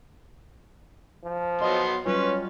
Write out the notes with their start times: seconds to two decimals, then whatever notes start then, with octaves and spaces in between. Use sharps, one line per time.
1.24 F3
1.61 F#3 B3 D#5 C6
2.06 F#3 G3 C#4 F4 B4